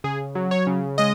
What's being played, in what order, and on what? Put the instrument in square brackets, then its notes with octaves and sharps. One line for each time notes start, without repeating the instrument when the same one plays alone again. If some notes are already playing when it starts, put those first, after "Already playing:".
[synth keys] C#3 G#4
F#3
C#5
C#3
G#3 D#5